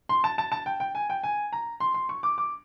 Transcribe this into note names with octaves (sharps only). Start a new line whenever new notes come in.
C6
A5
A5
A5
G5
G5
G#5
G5
G#5
A#5
C6
C6
C#6
D6
D6